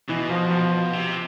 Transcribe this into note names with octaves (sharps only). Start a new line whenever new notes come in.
B2 E3
F3
F3
C3